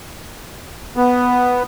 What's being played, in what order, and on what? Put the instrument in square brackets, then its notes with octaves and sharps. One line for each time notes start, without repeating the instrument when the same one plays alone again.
[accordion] B3